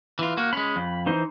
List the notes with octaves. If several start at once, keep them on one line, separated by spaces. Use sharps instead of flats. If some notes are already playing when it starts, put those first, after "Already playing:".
E3 F4
A#3 F#4
G#3 C#4 B5
F2
E3 D#4 C5